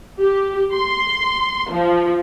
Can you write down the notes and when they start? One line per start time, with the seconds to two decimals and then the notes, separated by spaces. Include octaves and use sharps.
0.20 G4
0.74 C6
1.71 F3